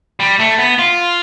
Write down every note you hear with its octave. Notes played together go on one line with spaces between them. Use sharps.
G3
A3
B3
F4